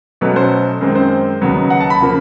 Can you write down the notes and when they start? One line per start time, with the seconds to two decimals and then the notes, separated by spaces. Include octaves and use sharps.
0.21 B2 F#3 A3 C#4 B4
0.36 C5
0.81 F#2 D#3 G#3 C4
0.95 C5
1.41 D#2 C#3 F#3 B3
1.70 F#5
1.80 A5
1.90 B5
2.01 C#3 F3 A#3